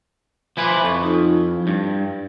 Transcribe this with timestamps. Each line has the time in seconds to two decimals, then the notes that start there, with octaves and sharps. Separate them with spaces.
0.57 F3 E4 B4 G#5 C6 D6
0.83 F2 A4 C#6
1.03 D#4 F4
1.37 E4
1.67 G2